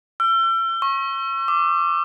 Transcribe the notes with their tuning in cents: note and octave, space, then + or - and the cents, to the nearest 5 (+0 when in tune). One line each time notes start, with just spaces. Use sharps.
E6 +40
C#6 -30
D6 +10